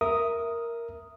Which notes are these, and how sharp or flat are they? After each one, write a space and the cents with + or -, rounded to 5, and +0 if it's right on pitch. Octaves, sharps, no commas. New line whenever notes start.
A#4 +0 E5 +5 D#6 +0